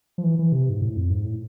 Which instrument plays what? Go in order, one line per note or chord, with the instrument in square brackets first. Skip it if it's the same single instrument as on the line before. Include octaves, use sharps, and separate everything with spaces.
[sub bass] F3
E3
E3
C3
G#2
A2
F2
G#2
A2